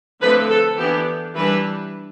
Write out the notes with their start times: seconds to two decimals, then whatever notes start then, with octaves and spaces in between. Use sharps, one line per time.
0.21 D3 F3 A3 C4 B4
0.49 A4
0.77 E3 B3 D4 G4
1.34 E3 G3 D4 B4